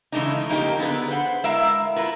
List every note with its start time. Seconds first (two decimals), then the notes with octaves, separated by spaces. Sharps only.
0.12 C#3 E3 G#3 A3 D4 D#4
0.49 F3 A#3 D#4 F4 G4 A#4
0.78 D3 B3 G4 G#4 B4
1.08 B4 C5 F#5
1.44 G#3 E4 A#4 E5 F5
1.96 E4 F4 A#4 B4